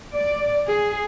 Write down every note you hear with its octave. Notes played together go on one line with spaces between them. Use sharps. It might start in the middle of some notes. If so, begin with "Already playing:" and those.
D5
G#4